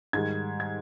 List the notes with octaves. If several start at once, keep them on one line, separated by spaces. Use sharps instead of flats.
G#2 D#3 G3 G#6
G#6